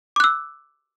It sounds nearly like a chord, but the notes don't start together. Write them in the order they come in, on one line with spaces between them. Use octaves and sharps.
D6 F#6 E6